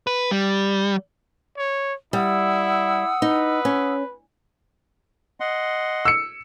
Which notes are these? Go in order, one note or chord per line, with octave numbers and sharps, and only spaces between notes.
B4
G3
C#5
G3 E4 F#5 D#6 E6
D#4 B4
C#4
D#5 F#5 C6
E6 C#7